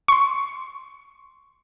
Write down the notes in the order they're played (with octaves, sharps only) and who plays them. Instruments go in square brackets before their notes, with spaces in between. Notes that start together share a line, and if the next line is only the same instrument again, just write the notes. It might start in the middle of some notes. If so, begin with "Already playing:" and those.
[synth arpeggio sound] C6 C#6